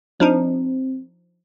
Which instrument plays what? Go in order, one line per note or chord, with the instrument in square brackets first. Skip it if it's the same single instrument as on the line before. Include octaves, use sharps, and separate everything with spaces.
[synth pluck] F3 D4 D#4 [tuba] C4